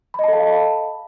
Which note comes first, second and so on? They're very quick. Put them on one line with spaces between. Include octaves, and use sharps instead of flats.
B5 D#5 A5 A4 F5